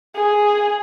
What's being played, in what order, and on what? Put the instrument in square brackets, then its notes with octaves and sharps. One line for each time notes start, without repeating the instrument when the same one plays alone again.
[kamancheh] G#4